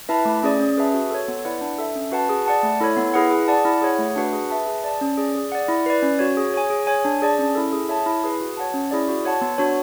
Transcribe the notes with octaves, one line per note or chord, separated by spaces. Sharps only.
E4 B4 E5 A5
A3
C#4 G#4 D5
C#4
G#4 B4 E5 A5
F#4
A4 C#5
B3
E4 B4 D5 F#5
D4
A4 E5
C#4
F#4 B4 F#5 A5
G#4
D5 F#5 A5
A3
E4 A4 C#5
B3
E4 G#4 B4 F#5
G#4
D5 F#5 A5
E4
G#4 C#5 F#5
A3
D4 F#4 B4 F#5
G#4
B4 E5 A5
G#4
D5 A5
C#4
G#4 D5
G#4
D5 F#5
E4
B4 D5
C#4
F#4 C#5
G#4
C#5 G#5
G#4
C#5 G#5
D4
G#4 D5 A5
C#4
E4 A4
G#4
C#5 E5 A5
E4
G#4 B4
F#4
C#5 F#5 A5
C#4
E4 G#4 D5
F#4
C#5 F#5 A5
B3
D4 F#4 C#5